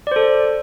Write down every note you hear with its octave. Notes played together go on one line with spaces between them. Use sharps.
A4 C5 D5